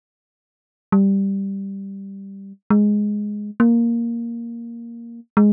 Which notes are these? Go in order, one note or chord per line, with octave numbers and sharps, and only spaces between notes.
G3
G#3
A#3
G#3